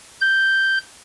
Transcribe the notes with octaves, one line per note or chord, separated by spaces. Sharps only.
G6